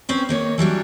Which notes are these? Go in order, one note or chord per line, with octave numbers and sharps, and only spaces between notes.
C4 C#4 B4
D#3 A#3 C#5
E3 F#3 G3 D4